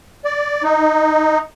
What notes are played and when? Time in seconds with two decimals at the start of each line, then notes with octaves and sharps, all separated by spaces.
0.25 D5
0.63 D#4